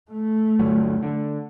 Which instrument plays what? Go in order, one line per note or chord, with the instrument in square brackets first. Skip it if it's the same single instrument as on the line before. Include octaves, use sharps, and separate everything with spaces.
[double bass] A3
[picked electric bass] G1 D2 F#3
D3